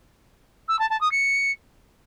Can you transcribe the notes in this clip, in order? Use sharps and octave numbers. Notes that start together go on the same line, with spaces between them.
E6
A5
A5
D#6
C#7